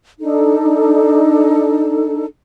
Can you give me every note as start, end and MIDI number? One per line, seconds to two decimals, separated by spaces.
0.20 2.25 62
0.20 2.25 63
0.20 2.25 69